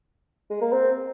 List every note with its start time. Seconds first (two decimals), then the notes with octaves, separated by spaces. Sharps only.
0.50 G#3
0.61 A#3
0.72 C4